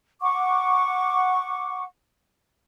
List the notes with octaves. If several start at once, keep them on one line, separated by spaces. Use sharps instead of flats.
F#5 C#6 D6